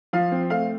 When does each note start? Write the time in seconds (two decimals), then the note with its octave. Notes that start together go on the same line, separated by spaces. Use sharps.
0.13 F3 F5
0.32 C4
0.50 A3 F5